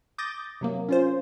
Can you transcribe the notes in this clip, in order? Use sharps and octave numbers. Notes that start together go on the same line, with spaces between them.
D6 D#6 G6 A6 A#6
C3 F#3 A#3
C#4 F4 C5